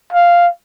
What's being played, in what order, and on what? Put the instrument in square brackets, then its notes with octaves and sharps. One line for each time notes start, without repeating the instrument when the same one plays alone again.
[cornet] F5